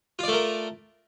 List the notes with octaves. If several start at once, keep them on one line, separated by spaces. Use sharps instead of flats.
A3 F4 A#4 D5